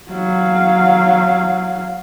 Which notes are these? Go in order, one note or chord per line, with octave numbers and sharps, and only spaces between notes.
F#3 F5